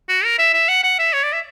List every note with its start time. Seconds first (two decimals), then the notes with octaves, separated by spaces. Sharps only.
0.09 F#4
0.24 A#4
0.39 E5
0.53 E5
0.69 F#5
0.83 F#5
0.99 E5
1.13 C#5
1.23 D5
1.33 E5